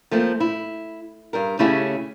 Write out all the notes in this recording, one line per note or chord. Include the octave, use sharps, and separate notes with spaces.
F3 A3 A#3 C4
E4
G2 G3 A#4
C#3 A3 C#4 E4 G4 G#4